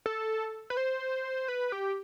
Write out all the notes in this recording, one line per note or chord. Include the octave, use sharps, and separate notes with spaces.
A4
B4
C5
B4
G4